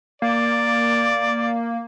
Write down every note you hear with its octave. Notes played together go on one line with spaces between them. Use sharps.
A#3 D5